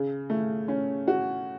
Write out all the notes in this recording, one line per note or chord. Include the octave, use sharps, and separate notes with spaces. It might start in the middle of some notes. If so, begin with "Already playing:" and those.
Already playing: C#3
A3
C#4
F#4